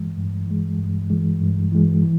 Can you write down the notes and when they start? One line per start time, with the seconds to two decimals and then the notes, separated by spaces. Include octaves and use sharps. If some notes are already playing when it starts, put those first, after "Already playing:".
Already playing: G2 E3 G#3
0.17 G2
0.47 E3 G#3
0.79 G2
1.10 E3 G#3
1.41 G2
1.72 E3 G#3
2.03 E3